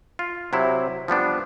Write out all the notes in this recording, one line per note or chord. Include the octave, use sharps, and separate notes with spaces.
F4
C3 F#3 E4
F3 G3 B3 D4